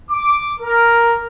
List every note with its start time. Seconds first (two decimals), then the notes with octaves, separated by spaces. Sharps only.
0.11 D6
0.60 A#4